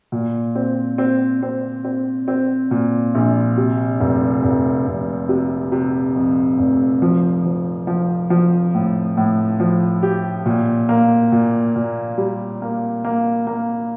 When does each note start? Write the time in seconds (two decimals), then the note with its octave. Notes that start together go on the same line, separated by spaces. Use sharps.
0.12 A#2
0.55 C4
0.98 C4
1.43 C4
1.85 C4
2.28 C4
2.71 A#2
3.15 A#1
3.57 C3
4.00 F1
4.43 F1
4.87 F1
5.29 C3
5.72 C3
6.16 F2
6.58 F1
7.02 F3
7.45 F3
7.87 F3
8.30 F3
8.74 A2
9.17 A2
9.60 F3
10.02 G4
10.46 A#2
10.89 A#3
11.32 A#2
11.76 A#2
12.18 G3
12.62 A#3
13.04 A#3
13.47 A#3